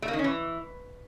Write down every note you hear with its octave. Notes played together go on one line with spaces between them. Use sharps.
A3
A#3
D#3
C#4
E3